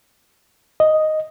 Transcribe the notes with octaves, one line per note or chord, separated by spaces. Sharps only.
D#5